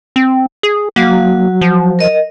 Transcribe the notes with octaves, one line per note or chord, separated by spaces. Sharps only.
C4
G#4
F#3 A#3 F#4
F3
A#4 D#5